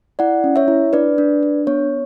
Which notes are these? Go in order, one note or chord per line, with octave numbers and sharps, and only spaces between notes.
E4 D5 F#5
C#4
C#5 E5
E4
D4 B4 D5
D4
D4
B3 C#5